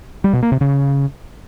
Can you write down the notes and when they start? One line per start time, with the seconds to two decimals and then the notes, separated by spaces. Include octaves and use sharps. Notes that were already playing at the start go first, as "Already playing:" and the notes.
0.24 G3
0.33 B2
0.42 A#3
0.52 C3
0.61 C#3